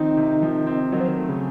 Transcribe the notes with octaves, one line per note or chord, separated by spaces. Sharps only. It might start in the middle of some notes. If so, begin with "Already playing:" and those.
Already playing: D#3 F3 C4 D#4
C3
F3
C4
D#3 F#3
F3
D#3
A3
C#3